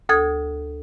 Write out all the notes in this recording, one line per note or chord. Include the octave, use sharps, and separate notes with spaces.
D2 A4 D#6 G#6